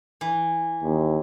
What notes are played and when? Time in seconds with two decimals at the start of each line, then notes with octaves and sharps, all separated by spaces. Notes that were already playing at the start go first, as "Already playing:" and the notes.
0.21 E3
0.83 D#2